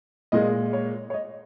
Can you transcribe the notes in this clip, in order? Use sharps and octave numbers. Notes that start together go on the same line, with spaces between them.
A#2 G#3 D#5
C#5
C#5
D#5